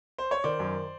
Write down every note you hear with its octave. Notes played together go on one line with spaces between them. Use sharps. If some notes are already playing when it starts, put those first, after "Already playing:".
C5
C#5
D#3 C5 D5
F#2